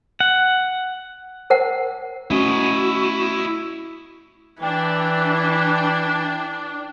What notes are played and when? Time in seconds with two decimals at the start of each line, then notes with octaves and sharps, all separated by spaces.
0.20 F#5
1.50 A#4 C5 F#5
2.31 A3 C#4 E4 F#4 D#5
4.63 E3 D4 G5